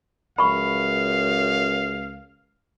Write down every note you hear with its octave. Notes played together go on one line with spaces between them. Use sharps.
C#2 F#2 F5 B5 C#6